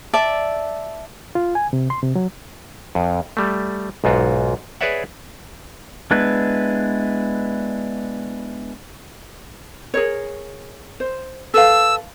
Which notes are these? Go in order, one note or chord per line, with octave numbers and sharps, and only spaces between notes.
D5 E5 A5
F4
G#5
C3
C6
C3
F#3
F2
G3 A3
B1 G#2 F4 F#4
G#4 B4 C#5 D5 E5 F#5
G#3 B3 D4 E4 B4
G#4 A#4 C#5
C5
A4 B4 F5 E6